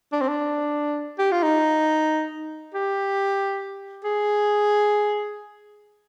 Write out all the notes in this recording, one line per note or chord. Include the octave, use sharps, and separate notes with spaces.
D4
C4
D4
G4
F4
D#4
G4
G#4